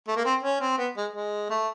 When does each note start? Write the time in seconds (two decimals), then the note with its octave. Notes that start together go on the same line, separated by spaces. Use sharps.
0.08 A3
0.16 A#3
0.25 C4
0.43 C#4
0.61 C4
0.78 B3
0.97 G#3
1.13 G#3
1.50 A3